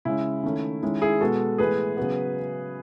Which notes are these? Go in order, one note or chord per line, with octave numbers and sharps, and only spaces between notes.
C#3 G#3 C#4 E4
D#3 A3 C#4
D#3 G#3 C#4 E4
E4 G#4
B2 G#3 B3 F#4 A4
A2 E3 G#3 B3 G#4 B4
C#3 F#3 B3